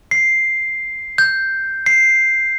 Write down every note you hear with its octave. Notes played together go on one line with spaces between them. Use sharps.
C7
G6
C7